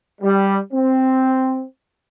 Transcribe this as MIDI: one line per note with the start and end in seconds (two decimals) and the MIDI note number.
0.22 0.57 55
0.73 1.64 60